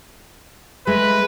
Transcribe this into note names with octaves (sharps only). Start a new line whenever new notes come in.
G#3 A3 B4